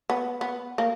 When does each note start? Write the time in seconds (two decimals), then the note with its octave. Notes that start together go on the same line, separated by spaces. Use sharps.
0.10 B3
0.41 B3
0.78 A#3